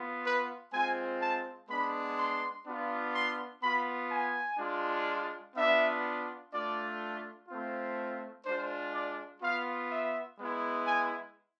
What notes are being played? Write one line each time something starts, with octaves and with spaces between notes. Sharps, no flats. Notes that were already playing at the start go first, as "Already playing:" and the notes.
Already playing: B3 F4
B4
G#3 C4 F4 G#5
A5
G#3 B3 D4 B5
C6
B3 D4 F4
C6
B3 F4 B5
G#5
G#3 D4 F4
B3 D4 F4 E5
A3 D4 F4 D5
A3 C4 F4
G#3 D4 F4 C5
D5
B3 F4 F5
E5
G#3 B3 E4
G#5